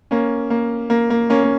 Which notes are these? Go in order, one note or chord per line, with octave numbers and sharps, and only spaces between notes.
A#3 C#4
A#3
A#3
A#3
A#3 C#4
A#3